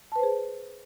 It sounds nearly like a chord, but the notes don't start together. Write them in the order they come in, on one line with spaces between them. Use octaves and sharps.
A5 B4 C5 G#4